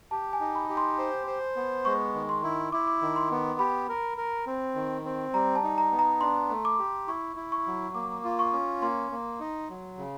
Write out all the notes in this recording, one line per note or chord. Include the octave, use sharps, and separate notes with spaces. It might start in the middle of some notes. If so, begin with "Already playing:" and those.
G4 A5
G#5
D#4
B5
G4
C6
C5
C5
B3
G#3 C#6
D#3
C6
E4
E4 D6
D6
D#3
C6
B3
G4 B5
A#4
A#4
C4
D#3
C4
G3 A#5
A5
D#4
A#5
B3
A#5
D4 C6
A3
D6
G4
E4 C#6
E4
C#6
F#3
A#3 D6
F4
C#6
C#4
A#3 C6
A#3
D#4
F#3
C#3